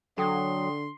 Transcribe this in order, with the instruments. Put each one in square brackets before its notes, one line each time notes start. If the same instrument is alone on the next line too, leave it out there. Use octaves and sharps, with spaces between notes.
[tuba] D3 [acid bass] F#3 [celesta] A4 G5 D#6 [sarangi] C6